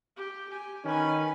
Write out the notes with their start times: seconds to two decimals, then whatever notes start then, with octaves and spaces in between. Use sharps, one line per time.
0.16 G4
0.49 G4 G#5
0.85 D#3 C#4 B4 G#5